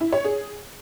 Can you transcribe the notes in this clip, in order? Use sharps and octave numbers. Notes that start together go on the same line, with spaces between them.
E4
C#5
G#4